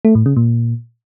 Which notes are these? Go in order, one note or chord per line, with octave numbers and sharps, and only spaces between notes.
A3
A2
C#3
A#2